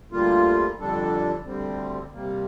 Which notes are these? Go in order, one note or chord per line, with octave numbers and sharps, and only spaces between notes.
D2 D3 G3 A#3 F4
F2 D3 G3 D4 A4
D2 D3 G3 C4
C3 G3 A#3